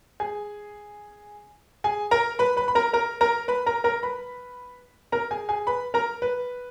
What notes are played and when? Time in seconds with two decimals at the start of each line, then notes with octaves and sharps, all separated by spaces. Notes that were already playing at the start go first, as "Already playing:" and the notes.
0.20 G#4 G#5
1.84 G#4 G#5
2.11 A#4 A#5
2.39 B4 B5
2.57 B4 B5
2.68 B5
2.75 A#4 A#5
2.93 A#4 A#5
3.21 A#4 A#5
3.48 B4 B5
3.66 A#4 A#5
3.84 A#4 A#5
4.03 B4 B5
5.12 A#4 A#5
5.31 G#4 G#5
5.49 G#4 G#5
5.67 B4 B5
5.94 A#4 A#5
6.22 B4